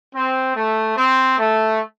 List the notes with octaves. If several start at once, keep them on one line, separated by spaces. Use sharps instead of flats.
C4
A3
C4
A3